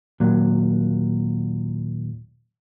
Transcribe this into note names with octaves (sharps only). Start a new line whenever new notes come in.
D#2 A#2 F#3